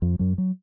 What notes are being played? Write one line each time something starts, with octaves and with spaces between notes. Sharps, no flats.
F2 F3
F#2 F#3
F#3